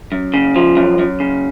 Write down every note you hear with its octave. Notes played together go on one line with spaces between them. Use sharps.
F#2
C#3
F3
F#2
F#2
C#3